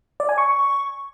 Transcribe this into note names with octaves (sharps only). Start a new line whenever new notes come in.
D5
G#5
C#6